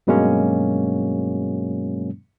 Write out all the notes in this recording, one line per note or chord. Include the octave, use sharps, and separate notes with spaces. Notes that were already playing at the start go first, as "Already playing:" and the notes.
G2 B2 F#3 G#3 A#3 C#4